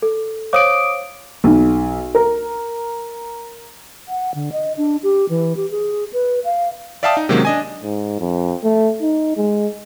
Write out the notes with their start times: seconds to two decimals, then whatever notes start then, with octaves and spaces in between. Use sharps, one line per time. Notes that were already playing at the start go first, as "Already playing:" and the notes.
0.02 A4
0.53 C5 C#5 F5 D6 D#6 D7
1.44 B1
2.15 A#4
4.08 F#5
4.35 D3
4.52 D#5
4.77 D4
5.03 G4
5.29 E3
5.57 G4
5.71 G#4
6.13 B4
6.45 F5
7.03 D5 E5 F5 G5 A5 D#6
7.17 D#4
7.29 C3 D#3 F#3 G#3 A#3 C#4
7.45 D4 D#5 G#5
7.83 G#2
8.20 F2
8.63 A3
9.02 D#4
9.37 G#3